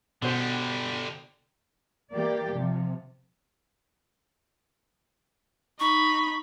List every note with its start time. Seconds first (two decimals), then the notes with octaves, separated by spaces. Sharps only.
0.22 B2 D3 G3 C5
2.12 E3 A#3 G4 D5
2.51 C3 F3
5.80 D#4 B5 C#6